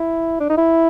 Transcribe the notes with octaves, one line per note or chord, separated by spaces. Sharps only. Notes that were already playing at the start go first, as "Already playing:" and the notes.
Already playing: E4
D4
D#4
E4